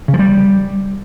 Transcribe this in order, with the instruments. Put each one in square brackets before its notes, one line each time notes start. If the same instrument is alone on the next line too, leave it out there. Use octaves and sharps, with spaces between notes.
[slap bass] C#3
F3
G3